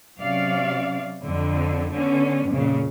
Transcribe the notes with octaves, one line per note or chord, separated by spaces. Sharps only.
C3 F#3 C#4 D5 F5
F2 D3
D3 B3 C#4
F2 A#2 C#3